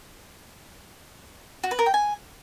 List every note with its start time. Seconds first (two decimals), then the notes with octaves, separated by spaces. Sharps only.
1.63 F#4
1.71 B4
1.79 A#4
1.86 G5
1.94 G#5